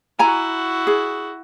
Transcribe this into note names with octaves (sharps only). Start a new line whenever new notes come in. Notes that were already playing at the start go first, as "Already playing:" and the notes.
E4 F#4 G#5 A#5
G#4